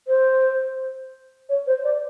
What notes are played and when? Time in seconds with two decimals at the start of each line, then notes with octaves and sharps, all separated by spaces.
0.07 C5
1.49 C#5
1.66 C5
1.84 D5